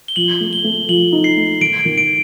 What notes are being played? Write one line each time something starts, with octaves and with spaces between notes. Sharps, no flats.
G7
F3 F#7
A3
G7
A3
F3 F#7
D#4
C7
A3
D#3 D7
D#3
D7